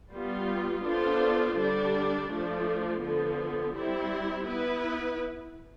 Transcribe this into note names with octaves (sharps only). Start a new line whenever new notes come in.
G3 B3 F4
B3 D4 F4 A4 C5
D3 G3 D4
F3 A3 D4
D3 F3 B3
G3 C4 E4
B3 E4 B4